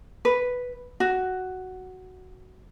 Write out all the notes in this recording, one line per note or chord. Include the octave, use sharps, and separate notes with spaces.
B4
F#4